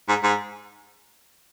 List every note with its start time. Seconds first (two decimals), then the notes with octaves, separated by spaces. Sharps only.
0.08 G#2
0.23 G#2